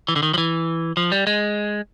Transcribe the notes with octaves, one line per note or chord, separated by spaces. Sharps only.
E3
D3
D#3
F3
E3
F3
G3
G#3